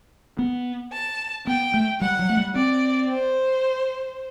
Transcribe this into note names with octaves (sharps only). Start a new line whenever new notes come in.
B3
A5
B3 G5
A3
G3 F#5
F#3
A3
G3
C4 D5
C5